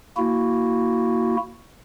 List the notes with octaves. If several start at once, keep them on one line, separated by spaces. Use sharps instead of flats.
A#3 E4 F#4